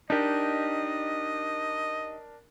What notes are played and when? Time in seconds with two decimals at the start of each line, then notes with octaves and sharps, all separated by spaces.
0.10 D4 D#4 G4 A#4 D#5